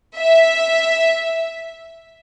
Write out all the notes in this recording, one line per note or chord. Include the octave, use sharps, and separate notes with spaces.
E5